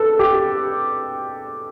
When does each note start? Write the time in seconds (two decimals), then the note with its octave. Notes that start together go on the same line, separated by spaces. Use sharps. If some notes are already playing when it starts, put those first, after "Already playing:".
Already playing: A4 B4
0.19 G4